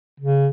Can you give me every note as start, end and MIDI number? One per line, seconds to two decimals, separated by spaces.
0.20 0.49 49